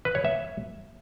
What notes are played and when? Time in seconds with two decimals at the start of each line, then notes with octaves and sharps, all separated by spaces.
0.05 B4
0.15 C#5
0.25 E5